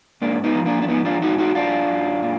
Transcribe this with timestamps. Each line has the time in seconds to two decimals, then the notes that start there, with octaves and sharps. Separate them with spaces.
0.22 G#2 A#3 D4
0.44 B3 D#4
0.55 F3
0.66 A#3 D4
0.82 D4
0.88 G#2 B3 D#4
1.05 D4 F4
1.21 G#2 D#4 F#4
1.38 D#4 F#4
1.55 F#2 D4 F4
1.88 F#2
2.22 A#2